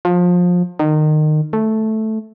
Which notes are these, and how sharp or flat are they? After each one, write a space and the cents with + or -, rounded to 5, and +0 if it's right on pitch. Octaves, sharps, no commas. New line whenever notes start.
F3 +25
D#3 -25
A3 -5